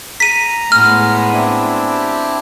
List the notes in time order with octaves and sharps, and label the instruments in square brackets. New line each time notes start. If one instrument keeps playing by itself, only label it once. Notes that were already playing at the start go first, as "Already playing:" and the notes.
[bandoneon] A#5 [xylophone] B6 D#7
[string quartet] A2 G#3 B3 [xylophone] F6
[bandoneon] C4 D4 E4
[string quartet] G4